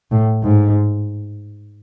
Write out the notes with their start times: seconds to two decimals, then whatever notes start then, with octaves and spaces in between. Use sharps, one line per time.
0.11 A2
0.43 G#2